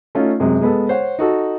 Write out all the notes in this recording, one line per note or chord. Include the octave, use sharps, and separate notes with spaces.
A3 C#4 D#4 F4
F#2 C3 G#3
G#3 B3 A4
C5 C#5 F#5
D#4 F#4 A4